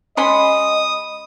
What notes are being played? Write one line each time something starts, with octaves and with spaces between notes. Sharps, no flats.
G#3 C#4 D#5 G#5 B5 C6 D#6